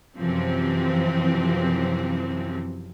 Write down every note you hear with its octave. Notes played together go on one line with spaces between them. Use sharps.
F#2 C3 E3 F3 C4